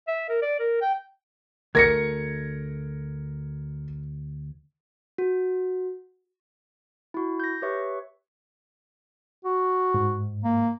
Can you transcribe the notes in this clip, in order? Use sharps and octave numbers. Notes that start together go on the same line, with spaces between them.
E5
A#4
D5
A#4
G5
D2 A3 A#4 G#6 A#6 C#7
F#4
E4 F#4
G6 A#6
G4 B4 C#5 E5 C#6
F#4
G#2
A#3